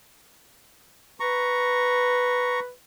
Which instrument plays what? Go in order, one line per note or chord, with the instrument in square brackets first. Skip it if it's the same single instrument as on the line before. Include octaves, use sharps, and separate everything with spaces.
[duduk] B4 [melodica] A#5 C#6